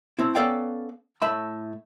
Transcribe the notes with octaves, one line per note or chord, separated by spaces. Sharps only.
A3 C4 E4
B3 C#4 A4 D5 F5 G5
A2 A3 E5 B5